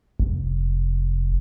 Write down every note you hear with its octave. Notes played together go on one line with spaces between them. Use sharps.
F1